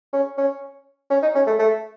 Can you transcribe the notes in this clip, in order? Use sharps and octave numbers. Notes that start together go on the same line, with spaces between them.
C#4
C#4
C#4
D#4
C#4
A3
A3